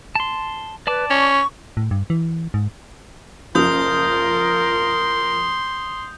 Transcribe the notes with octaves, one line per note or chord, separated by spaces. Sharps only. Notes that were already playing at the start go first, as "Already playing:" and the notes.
A5 C6
B4 D5 A5 D6
C#4 C#6
A2
G2
E3
G#2
F#1 F3 F4 A#4 C6 D#6 G6